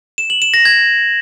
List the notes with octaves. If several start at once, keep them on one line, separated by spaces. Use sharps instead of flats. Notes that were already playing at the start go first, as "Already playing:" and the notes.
E7
F#7
E7
A#6
G#6